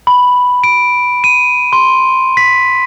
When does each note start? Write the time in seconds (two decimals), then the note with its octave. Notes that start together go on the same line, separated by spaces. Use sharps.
0.07 B5
0.64 D7
1.24 D#7
1.73 C6
2.37 B6